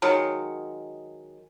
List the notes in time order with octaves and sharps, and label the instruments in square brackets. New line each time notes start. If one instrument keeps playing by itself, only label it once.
[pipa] D#3 F#3 G#3